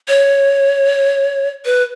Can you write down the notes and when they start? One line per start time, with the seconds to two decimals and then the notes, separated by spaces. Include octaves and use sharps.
0.08 C#5
1.65 B4